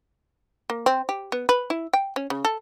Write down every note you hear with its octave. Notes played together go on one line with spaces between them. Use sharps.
A#3
C4
G4
B3
B4
E4
G5
C#4
C#3
A4